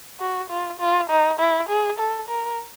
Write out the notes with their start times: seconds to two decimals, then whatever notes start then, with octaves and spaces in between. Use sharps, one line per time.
0.20 F#4
0.49 F4
0.80 F4
1.10 D#4
1.39 E4
1.69 G#4
1.99 A4
2.29 A#4